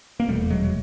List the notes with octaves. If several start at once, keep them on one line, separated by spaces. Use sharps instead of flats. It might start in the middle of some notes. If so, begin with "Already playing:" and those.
A#3
F1 E2 B2 G3 A3
F#3 G#3
F#3